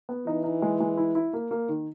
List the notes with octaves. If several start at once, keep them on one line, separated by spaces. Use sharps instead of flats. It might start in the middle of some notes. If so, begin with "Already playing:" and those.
B3
E3 D#4
D#4
G#3
G#3
E4
E4
A#3
A#3
D#3